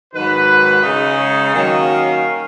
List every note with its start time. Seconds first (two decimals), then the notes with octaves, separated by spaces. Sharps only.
0.14 G#2 D#3 F#3 B4
0.82 C#3 G#3 D#4
1.18 C#5
1.53 D#3 F#3 A#3 C#4 D#5
1.88 F5